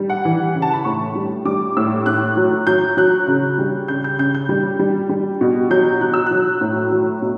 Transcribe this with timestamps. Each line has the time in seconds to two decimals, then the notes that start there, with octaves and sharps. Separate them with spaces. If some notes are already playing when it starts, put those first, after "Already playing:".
Already playing: G3
0.09 F#5
0.25 E3
0.55 C#3
0.62 A5
0.73 B5
0.85 A2 C#6
1.15 G3
1.45 G3 D6
1.77 A2 E6
2.06 A2 F#6
2.37 F#3
2.67 F#3 G6
2.97 F#3 F#6
3.28 C#3
3.58 G3
3.88 C#3 G6
4.04 G6
4.19 C#3 G6
4.35 G6
4.49 G3
4.79 G3
5.09 G3
5.41 B2
5.70 F#3 G6
6.01 F#3 F#6
6.14 E6
6.26 F#3 F#6
6.61 A2
6.92 F#3
7.22 B2